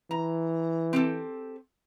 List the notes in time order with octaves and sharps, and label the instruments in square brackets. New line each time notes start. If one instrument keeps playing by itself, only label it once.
[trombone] E3 [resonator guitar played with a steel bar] A#5
[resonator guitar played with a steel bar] C4 G4 A4